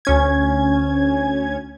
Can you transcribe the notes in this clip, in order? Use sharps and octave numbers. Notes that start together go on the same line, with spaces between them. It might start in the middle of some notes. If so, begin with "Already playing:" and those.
D2 C#4 G#6